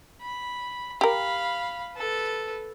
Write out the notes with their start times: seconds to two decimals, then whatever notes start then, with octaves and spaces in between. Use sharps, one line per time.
0.22 B5
1.01 G4 A#4 F5 B5
1.95 A4 B4